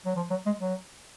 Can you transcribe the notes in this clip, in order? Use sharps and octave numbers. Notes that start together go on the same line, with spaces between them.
F#3
F3
F#3
G#3
F#3